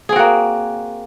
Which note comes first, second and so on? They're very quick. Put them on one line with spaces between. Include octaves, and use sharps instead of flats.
G#4 C4 F#4 A#3